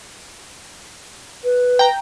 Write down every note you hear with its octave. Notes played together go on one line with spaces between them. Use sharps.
B4
G5 A#5